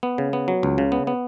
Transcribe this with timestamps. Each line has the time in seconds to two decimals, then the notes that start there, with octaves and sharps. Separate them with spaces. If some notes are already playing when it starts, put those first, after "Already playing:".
0.03 B3
0.18 C#3
0.33 B3
0.48 F#3
0.63 C#2
0.78 C#3
0.92 B3
1.07 B3